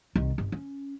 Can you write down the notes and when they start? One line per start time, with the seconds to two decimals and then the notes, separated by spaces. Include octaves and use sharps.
0.16 C2 D#3
0.38 G1
0.52 C#4